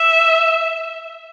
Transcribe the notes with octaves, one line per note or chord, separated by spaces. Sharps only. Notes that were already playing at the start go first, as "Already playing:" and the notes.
Already playing: E5